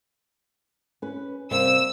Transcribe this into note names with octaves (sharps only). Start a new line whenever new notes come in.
C#4 B4
C3 G3 A#3 E6